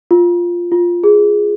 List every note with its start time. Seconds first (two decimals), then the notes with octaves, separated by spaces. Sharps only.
0.11 F4
0.72 F4
1.04 G#4